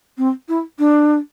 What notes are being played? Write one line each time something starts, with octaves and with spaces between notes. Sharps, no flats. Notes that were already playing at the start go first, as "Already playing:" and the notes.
C4
E4
D4